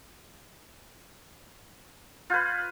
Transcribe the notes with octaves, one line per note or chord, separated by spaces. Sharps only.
F4 B4 F6 G6 G#6